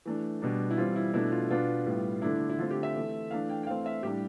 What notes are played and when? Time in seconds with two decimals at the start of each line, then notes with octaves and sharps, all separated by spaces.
0.06 E3 A3 D4
0.42 B2 G3 D4
0.71 E4
0.77 E3 G3 C4 F4
0.96 E4
1.14 B2 A3 D4 E4
1.32 F4
1.50 B2 B3 D4 F4
1.86 A2 G3 B3
2.22 D3 A3 D4 E4
2.50 E4
2.59 D3 A3 C4 F4
2.71 G4
2.83 E5
2.95 E3 A3 C4
3.31 E3 A3 D4 F5
3.49 G5
3.63 G5
3.67 E3 A3 C4 F5
3.86 E5
4.03 A2 G3 D4 G4